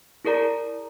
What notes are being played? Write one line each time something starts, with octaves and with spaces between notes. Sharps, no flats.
E4 G#4 A#4 D5 A#5